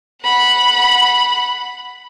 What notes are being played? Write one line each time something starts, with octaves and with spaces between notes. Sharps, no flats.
F#5 B5